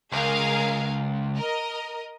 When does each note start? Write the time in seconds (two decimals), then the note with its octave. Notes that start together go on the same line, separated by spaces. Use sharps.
0.12 C#2 G#4 A#4 F5
1.34 A#4 D#5